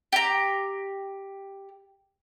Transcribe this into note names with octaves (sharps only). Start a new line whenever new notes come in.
G4 A#5